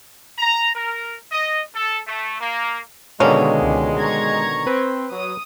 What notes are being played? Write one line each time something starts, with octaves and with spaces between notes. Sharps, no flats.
A#5
A#4
D#5
A4
A3
A#3
B2 D3 D#3 G#3 A#3 C#4
C#2
A#5 C#6 G#6
C4 B4
F#3 D#6